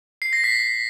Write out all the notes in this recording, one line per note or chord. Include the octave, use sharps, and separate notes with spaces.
C7
A#6
B6